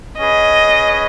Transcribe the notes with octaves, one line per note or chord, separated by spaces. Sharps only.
C#4 G#4 B4 D#5